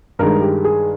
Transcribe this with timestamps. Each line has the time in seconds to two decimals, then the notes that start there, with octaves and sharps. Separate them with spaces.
0.19 G2 D#3 G#3 A#4
0.41 G4
0.64 G#4